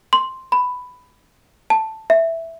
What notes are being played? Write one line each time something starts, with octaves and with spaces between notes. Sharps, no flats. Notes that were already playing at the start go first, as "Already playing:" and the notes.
C6
B5
A5
E5